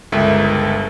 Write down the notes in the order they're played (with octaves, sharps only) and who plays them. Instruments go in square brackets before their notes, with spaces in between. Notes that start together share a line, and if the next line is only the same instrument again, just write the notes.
[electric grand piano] G1 C#2 G#3 A4 A#4 E5